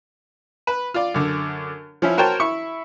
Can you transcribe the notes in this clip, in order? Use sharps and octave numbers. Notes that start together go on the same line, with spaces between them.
B4
F4 D5
F#2 D3
F3 C#4 E4
F#4 A#4 C5 C#5 G5 A5
E4 C#6